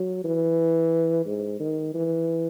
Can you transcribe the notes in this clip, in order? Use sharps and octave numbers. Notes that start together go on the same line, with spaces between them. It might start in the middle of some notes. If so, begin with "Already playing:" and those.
Already playing: F#3
E3
G#2
D#3
E3